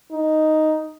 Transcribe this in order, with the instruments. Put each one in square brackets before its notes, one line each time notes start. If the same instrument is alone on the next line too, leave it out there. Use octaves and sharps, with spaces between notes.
[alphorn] D#4